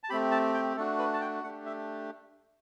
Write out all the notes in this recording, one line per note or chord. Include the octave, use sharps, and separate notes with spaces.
A5
A3 C4 G4 B5
A5
G5
A3 D4 F#4 A4
B4
A5
G5
A3 D4 G4 F#5
E5